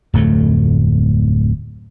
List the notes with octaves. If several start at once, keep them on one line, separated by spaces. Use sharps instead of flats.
D1 F2 A3